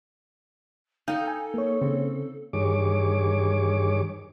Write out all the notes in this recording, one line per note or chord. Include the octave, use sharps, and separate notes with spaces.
D#4 A4 F5 G5 G6
G#5
A#3 C#5
C#3 C4
G2 D#3 G#4 C#5 D6